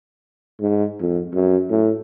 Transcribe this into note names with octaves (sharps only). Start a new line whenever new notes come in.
G#2
F2
F#2
A2